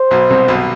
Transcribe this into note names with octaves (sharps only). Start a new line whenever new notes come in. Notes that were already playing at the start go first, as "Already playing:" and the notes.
Already playing: C5
B1 B2
C2 C3
B1 B2